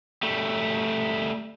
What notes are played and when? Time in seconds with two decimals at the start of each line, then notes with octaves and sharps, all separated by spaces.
0.23 G3 A3